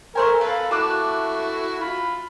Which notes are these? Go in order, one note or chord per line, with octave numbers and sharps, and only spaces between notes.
A3 A#4 C5 G#5
A4 B4 F5
A3 E4 F#4 A5 D6 F#6
F4 B5